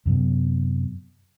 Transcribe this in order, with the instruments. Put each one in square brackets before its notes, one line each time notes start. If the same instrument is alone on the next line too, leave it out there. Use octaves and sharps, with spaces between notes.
[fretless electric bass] F#2 C3 F#3 B3